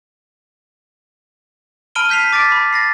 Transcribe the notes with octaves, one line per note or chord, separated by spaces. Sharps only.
A5 B5 F6 D7 D#7 G7
F6 G6 B6 C7 F7
D6 A6 B6 D7
B5
A6 A#6 C7